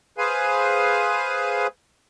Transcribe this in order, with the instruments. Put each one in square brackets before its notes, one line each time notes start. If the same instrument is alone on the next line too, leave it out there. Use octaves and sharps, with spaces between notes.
[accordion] G#4 B4 C5 F5 G#5